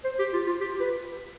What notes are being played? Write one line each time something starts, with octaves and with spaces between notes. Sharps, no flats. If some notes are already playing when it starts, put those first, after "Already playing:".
C5
G4
F4
F4
G4
B4